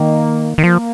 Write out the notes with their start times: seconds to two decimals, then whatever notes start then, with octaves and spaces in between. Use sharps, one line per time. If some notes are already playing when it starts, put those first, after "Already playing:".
Already playing: D#3 A#3
0.58 D#3
0.63 F3 A#3